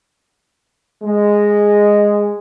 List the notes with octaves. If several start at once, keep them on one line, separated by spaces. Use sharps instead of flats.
G#3